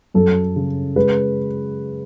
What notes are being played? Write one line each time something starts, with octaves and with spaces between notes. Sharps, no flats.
F#2 A4
C#3
G#3 B4